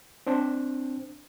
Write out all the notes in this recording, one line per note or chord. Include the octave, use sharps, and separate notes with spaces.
C4 D4 C5